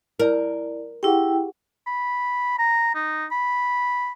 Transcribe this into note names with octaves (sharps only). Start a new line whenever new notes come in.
E4 A#4 D5
E4 G4 G#4 F#5 G5
B5
A#5
D#4
B5